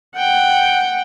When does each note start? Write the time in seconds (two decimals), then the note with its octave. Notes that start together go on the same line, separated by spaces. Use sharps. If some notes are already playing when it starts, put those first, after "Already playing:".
0.15 F#5 G5